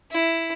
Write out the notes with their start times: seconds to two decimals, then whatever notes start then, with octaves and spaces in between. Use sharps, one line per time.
0.12 E4